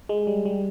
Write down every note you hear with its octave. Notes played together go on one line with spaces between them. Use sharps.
G#3
G3
G3